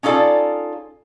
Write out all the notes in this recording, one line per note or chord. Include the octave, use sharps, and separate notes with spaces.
C#4 D#4 F4 A4 D5